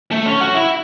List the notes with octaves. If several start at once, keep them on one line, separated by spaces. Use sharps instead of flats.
A3
C#4
F#4
E4